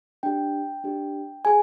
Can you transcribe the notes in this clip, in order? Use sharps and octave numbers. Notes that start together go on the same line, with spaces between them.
D4 G4 G5
D4 G4
G#4 G#5